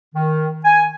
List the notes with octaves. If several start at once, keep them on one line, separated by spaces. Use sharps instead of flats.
D#3
G#5